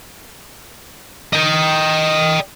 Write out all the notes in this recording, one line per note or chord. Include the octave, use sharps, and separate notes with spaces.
D#5 G5